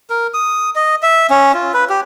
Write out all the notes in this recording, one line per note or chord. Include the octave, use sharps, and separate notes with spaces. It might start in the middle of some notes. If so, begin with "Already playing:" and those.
A#4
D#6
D#5
E5
C#4
F4
B4
G4